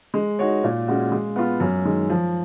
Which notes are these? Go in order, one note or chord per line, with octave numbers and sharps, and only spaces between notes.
G#3
D#4 F#4 C#5
A#2
G#3 C#4 F#4
G#3
B3 F4
F#2
D#3 G#3
F3